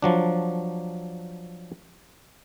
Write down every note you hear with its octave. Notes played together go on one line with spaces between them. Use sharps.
F3 F#3 D4